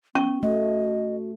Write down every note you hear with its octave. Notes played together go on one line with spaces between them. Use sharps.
B3 C#4 C#6
A3 F#4 D#5